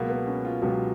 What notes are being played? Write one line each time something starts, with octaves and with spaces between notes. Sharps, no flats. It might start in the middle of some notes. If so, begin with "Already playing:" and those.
Already playing: C#2 B2 F#3 A#3
B3
C#4
F4
C#2 B2 F#3 G4